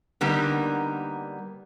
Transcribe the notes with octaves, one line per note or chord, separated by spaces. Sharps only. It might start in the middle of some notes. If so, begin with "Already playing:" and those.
D3 G3 A#3 B3 D#4